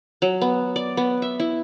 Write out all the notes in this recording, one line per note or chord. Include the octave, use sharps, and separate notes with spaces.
F#3
B3
D5
B3
E5
E4